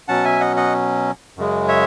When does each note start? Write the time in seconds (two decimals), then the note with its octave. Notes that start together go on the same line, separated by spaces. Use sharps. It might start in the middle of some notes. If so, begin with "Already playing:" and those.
0.08 B2 F#3 C#4 F#5 A5
0.25 E5 G#5
0.40 D#5 F#5
0.57 D#5 F#5
1.37 F#2 C#3 G#3
1.68 C#5 E5